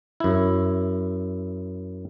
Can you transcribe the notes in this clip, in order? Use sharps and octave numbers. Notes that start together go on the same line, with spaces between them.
F#2 E4